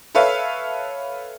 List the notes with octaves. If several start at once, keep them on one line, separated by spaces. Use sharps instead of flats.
A4 B4 C#5 E5 F5